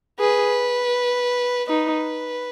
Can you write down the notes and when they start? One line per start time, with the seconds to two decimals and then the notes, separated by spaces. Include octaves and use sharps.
0.20 G#4 B4
1.69 D#4 B4